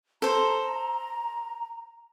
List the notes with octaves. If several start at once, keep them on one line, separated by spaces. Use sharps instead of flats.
A4 C5 A#5